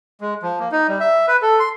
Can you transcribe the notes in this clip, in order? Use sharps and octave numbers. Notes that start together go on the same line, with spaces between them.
G#3
F3
A#3
D#4
G3
E5
B4
A4
C6